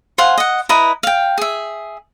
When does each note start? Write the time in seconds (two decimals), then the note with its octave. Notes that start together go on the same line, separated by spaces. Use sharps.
0.18 C5 F5 F#5 G#5
0.38 D#5 F#5
0.69 E4 B4 D#5 A#5
1.03 F5 G5
1.38 G#4 E5